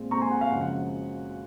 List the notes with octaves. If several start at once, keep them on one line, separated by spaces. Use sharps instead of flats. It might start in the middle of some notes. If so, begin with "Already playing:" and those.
Already playing: A#2 G#3 C4
A#2 G#3 C4 A#5 C#6
G#5 C6
F#5
F5
G#1 F#2 C#3 F3 F#5
F#5